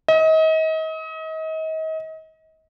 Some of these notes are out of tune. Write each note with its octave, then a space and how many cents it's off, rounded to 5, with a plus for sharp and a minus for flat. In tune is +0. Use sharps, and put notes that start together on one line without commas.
D#5 +35